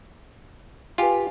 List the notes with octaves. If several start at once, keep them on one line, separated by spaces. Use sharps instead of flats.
F4 G4 B4 G#5